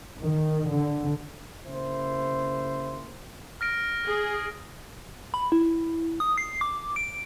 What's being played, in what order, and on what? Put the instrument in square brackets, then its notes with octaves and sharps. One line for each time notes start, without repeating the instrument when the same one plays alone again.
[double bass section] D#3
D3
[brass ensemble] C#3 A#3 E4 C5
[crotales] F6 A#6 D7
[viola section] G#4
[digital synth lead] B5
E4
D#6
C7
D6
D7